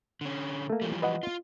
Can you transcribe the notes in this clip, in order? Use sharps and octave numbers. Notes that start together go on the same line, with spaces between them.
D3 C#4
A3 A#3
E3 F3 G3
B4 D#5 F#5
F4